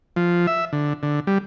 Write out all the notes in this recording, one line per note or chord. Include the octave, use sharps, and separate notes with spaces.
F3
E5
D3
D3
G3